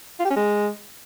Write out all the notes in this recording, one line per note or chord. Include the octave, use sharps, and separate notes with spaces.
F4
G4
C#4
G#3